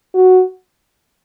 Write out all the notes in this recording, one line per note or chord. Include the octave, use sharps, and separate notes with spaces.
F#4